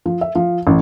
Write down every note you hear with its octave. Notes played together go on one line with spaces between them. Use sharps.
F3
E5
F3
A1